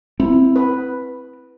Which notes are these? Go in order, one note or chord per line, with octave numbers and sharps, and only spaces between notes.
C4 E4
B4